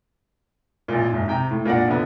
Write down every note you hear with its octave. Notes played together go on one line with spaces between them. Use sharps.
A1 A#2
F#1 G#2
C3 G5 A#5
A2
A#2 A#3 D4 F#5
A#1 D3 B3